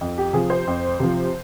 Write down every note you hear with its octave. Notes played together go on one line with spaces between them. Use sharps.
F2
G4
C3 F3 G#4
C5
F2
C3 F3